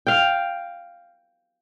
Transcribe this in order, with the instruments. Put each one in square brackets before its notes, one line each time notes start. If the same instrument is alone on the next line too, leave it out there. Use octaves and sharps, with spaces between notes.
[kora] F5 G5